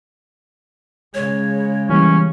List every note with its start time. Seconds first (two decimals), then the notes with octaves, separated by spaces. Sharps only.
1.14 C#3 G#3 C#5
1.89 E3 G3 A#3 C#4